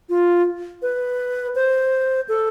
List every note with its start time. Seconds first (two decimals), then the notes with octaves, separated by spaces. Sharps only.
0.09 F4
0.82 B4
1.55 C5
2.29 A4